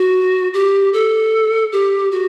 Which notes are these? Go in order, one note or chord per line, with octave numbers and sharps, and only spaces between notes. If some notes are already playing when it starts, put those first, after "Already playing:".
Already playing: F#4
G4
A4
G4
F#4